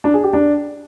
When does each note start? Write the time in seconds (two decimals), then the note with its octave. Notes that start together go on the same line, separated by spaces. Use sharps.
0.04 D4
0.14 G#4
0.24 G4
0.33 D4